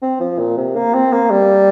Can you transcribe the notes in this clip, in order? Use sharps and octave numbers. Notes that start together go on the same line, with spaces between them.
C4
F3
A#2
C3
A#3
C4
A#3
G3